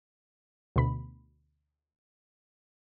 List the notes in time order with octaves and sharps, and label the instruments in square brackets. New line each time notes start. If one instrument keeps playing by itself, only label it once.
[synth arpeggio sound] D2 B2 B5